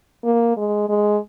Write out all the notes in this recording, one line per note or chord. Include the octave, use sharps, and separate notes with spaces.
A#3
G#3
G#3